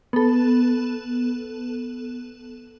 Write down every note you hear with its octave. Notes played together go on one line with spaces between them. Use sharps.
B3 A4